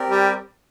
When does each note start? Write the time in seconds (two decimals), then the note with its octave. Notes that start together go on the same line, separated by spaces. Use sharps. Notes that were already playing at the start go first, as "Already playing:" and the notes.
Already playing: C4 G4 A#4 D5
0.10 G3